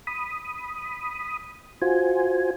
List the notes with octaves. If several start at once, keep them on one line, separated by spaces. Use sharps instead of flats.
B5 D#6
F4 F#4 C5 G#5